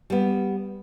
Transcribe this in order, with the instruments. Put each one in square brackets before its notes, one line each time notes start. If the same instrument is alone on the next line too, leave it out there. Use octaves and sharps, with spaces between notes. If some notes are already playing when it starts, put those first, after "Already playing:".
[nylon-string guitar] G3 B3